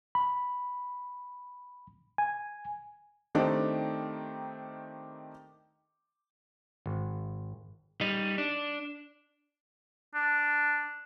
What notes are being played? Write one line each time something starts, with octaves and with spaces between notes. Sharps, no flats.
B5
G#5
D#3 A3 C4 D4 D#4 G4
G#1
G3 D#4
D4
D4